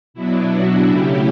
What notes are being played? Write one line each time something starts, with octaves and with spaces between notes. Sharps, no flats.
B2 F#3 B3 D4 E4
D4 F#4
C#3 F#3 A3 C#4 E4 G4